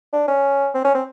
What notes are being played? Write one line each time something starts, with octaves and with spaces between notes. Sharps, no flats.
D4
C#4
C4
C#4
C4